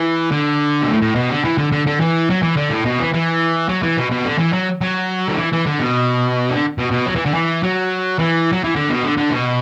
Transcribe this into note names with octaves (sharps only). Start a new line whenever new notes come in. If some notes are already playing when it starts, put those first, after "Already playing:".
Already playing: E3
D3
B2
A2
A2
B2
D3
E3
D3
D3
D3
E3
F#3
E3
D3
A2
B2
E3
E3
F#3
E3
B2
B2
D3
E3
F#3
F#3
D3
E3
E3
D3
B2
D3
B2
B2
F#3
E3
D3
E3
F#3
E3
F#3
E3
D3
B2
D3
D3
B2